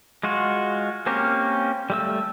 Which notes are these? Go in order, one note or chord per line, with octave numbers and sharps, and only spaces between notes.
G#3 F4 F#4
A#3 C4 C#4 G4 A#4
G3 A3 E6